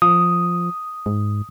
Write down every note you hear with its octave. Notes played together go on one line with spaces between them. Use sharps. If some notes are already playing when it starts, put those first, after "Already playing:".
F3 D#6
G#2